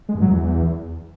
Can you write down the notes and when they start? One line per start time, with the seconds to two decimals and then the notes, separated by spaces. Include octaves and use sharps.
0.09 G#3
0.15 G2
0.21 F#3
0.28 E2